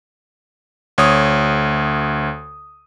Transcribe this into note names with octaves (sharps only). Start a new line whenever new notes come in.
D2 C#5 D#6